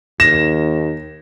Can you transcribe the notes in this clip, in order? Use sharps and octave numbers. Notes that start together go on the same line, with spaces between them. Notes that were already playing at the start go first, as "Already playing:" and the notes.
D#2 A#6 E7